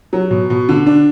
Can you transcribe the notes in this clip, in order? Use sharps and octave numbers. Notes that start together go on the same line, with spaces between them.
F#3
B2
B2
D3
D4